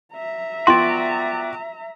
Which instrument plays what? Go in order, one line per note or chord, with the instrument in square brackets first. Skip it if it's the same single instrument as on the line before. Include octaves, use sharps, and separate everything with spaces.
[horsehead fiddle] E5 A#5
[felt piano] B3 F4 G5 [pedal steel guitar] F#4 D5 [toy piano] C6